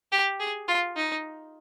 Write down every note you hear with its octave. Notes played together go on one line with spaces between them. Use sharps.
G4
G#4
F4
D#4